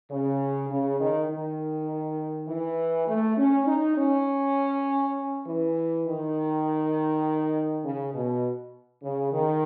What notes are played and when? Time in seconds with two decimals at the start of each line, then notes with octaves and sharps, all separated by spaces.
0.11 C#3
0.70 C#3
0.99 D#3
1.29 D#3
2.48 E3
3.08 A3
3.38 C#4
3.67 D#4
3.96 C#4
5.46 E3
6.06 D#3
7.84 C#3
8.14 B2
9.03 C#3
9.32 D#3